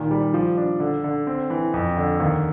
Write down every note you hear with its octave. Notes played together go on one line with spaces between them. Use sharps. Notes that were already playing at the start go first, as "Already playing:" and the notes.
Already playing: A#2 D#3
G3
F3
D4
D3
D3
C4
E3
F2
D3
D#2